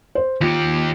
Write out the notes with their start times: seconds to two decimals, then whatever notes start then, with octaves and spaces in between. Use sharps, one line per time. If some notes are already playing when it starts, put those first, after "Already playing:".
0.15 C5
0.41 D#2 F4 G4